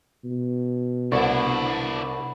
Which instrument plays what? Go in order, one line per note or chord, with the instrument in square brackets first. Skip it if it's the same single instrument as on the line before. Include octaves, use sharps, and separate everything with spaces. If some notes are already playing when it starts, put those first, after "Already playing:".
[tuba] B2
[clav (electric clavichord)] C2 [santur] B3 C#6 [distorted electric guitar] D4 E4